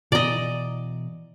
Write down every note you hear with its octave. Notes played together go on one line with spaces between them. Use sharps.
B2 E3 D5 D#5 A#5